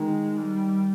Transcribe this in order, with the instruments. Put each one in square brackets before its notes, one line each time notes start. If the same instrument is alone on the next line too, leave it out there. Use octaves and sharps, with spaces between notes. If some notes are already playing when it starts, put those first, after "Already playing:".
Already playing: [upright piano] D#3 [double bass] G#3
[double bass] G3